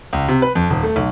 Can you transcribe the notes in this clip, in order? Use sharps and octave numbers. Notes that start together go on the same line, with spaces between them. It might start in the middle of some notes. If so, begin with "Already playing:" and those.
C#2
C3
B4
F2
D#1
A3
B1